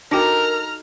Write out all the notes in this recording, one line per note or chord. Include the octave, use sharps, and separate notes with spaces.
D4 D#4 F#4 A4 A#4 G5 A#5 F6